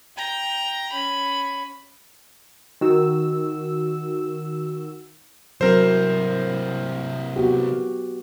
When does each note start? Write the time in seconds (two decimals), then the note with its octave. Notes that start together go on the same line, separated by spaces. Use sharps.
0.17 G5 A#5
0.92 C#4 B5
2.81 D#3 F#4 E6
5.61 C3 E3 F#3 C4 A#4 C5
7.36 B3 F#4 G4